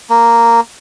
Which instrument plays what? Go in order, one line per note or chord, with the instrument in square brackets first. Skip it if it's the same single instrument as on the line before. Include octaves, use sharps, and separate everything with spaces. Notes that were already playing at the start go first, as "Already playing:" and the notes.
[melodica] A#3